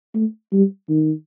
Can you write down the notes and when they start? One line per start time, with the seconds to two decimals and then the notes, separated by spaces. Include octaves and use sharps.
0.14 A3
0.52 G3
0.89 D#3